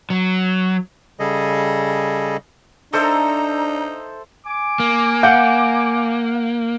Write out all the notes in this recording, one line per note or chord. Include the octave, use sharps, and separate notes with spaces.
F#3
C#3 G3 G#4 A4 D#5
D4 D#4 A4 C5 E5 A#5
G#5 D6
A#3
F5 F#5 G6